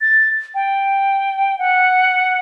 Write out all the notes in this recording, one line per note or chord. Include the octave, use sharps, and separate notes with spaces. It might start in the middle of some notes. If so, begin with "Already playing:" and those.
A6
G5
F#5